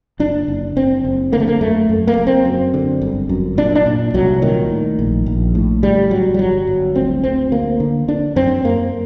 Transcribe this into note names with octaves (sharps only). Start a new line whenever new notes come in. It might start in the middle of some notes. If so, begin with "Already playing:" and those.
F#1 D4
F#1
F#1 C4
F#1
D3 A#3
A3
A#3
F#2 A3
F#2
A#3
F#1
C4
F#2
D3
G1
F#2
A#2 D4
D4
A#2
C2 F#3
A#2 D#3
A2
A#1
A#1
A2
D3 G3
G1 F#3
G3
G1 F#3
G1
D2 C4
D2 C4
D3 A#3
D3
D3 D4
F#2 C4
F#2 A#3